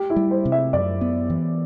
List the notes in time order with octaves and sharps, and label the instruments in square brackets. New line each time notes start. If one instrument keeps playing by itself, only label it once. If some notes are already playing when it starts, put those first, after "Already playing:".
Already playing: [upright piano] G4
E4
[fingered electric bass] G3
[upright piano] C5
[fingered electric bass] C3
[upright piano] E5
[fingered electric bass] F#2 [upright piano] D5
[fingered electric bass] B3
E3